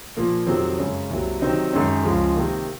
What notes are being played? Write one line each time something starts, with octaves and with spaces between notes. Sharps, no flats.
A#2 F3 A#3
F2 C3 D#3 F#3 C4
F#2 C#3 G#3 C#4
C2 C3 F#3 A#3
C3 D#3 F#3 C4 D#4
F#2 D#3 G#3 C#4
C#2 C#3 F3 G#3
C3 D#3 A#3